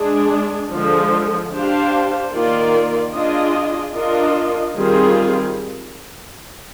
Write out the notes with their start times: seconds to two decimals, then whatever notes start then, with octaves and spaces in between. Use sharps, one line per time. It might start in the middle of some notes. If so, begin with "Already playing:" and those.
Already playing: G#3 D4 G#4
0.71 D3 F3 G#3
1.51 D4 G4 C5 F5
2.32 D#3 A#3 F4 A#4 D5
3.12 D4 F4 G#4 D#5
3.93 D4 F4 A#4 D#5
4.74 D#3 G3 C4 F4 G#4